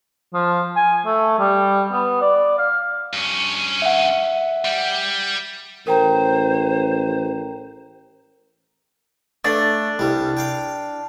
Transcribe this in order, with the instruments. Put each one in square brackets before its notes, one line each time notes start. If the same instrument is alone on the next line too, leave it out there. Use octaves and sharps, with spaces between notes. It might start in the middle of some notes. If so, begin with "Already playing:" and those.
[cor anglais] F3
G#5
A3
G3
B3
D5
F5
[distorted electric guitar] G2 C#4
[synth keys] E5 F#5
[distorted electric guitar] G3
[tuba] A1 [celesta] A#4 G5 A#5 [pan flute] C5
[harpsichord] A3 [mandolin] D4
[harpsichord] C2 G3
F5 G5